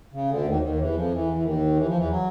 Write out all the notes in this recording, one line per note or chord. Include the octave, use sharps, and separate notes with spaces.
C#3
D2 D3
D#2 D#3
D#2 D#3
D#3
E2 E3
F2 F3
E2 E3
E3
D#2 D#3
E3
F3
E2 E3
F#3